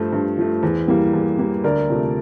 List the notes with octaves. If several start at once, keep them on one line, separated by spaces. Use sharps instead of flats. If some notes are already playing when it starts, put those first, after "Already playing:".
Already playing: G2 F3 A3 C5
G2
F3 A3
E2
E3 G3 A#3
E2
E3 G3 A#3
D2 A#4 D5
C3 F3 A3